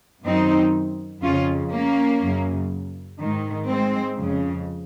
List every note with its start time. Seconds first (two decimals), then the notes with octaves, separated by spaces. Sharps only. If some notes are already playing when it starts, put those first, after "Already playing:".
0.25 F#2 D#3 C4 D#4
1.22 F2 C#3 C#4 F4
1.72 A#3 C#4
2.21 F#2 C#3
3.19 G#2 D#3
3.67 G#3 C4
4.16 F2 C#3